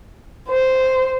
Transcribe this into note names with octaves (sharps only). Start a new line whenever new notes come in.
C5